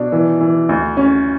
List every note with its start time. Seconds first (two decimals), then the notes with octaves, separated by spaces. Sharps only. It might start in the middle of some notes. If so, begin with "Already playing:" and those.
Already playing: B2 D4
0.12 E3
0.41 E3
0.69 D2
0.97 C#4